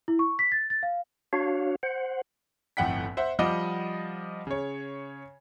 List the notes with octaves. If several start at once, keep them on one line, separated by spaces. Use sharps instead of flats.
E4
C#6
B6
A6
A6
F5
D4 F#4 C#5 F5
C5 F#5
G1 F2 A2 F#5 G5 B6
C5 E5 F#5
F3 G3 D#5 F#5 D6 G7
C#3 C#5